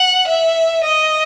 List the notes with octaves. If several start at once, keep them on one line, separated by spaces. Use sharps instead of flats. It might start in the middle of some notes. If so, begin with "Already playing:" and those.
Already playing: F#5
E5
D#5